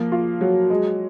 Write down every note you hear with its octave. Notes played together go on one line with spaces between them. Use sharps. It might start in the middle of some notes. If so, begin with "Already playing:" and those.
Already playing: F3 A#3
F4
F#3
G#3